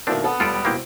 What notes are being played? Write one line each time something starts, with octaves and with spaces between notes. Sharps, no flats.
B2 D#3 A3 A#3 C4 D4 E4 F#4
B3 A4 F#5
E1 G3 F4 A4 G5 D7
C3 A#3 C4 E4 F#4 G4